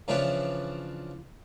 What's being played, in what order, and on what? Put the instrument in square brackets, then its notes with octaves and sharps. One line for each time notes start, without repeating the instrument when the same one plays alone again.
[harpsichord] C#3 E3 F3 D4 B4 C#5